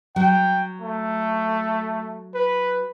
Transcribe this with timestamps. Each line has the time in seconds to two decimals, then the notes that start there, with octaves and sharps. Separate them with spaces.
0.16 F#3 G5
0.82 A3
2.35 B4